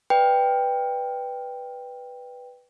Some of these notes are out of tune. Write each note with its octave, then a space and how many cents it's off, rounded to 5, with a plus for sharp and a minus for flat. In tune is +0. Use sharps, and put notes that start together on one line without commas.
B4 +0 D5 +25 G5 +10